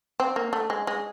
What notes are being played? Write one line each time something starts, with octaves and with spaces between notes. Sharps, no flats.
C4
A#3
A3
G#3
G#3